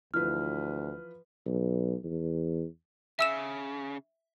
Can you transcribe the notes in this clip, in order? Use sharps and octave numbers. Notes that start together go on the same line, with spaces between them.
D2 E3 F3 B4 F6
B1
E2
C#3 E5 E6 E7